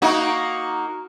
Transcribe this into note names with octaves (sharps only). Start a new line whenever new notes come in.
A#3 D#4 F#4